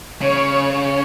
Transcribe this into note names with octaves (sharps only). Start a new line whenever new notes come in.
C#3 C#5
C#5